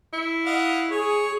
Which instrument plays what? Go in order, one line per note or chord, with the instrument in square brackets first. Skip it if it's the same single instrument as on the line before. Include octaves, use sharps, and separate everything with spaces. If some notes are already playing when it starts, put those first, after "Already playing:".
[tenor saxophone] E4
[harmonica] D#5 F5 F#5
[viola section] G#4 [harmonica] C#5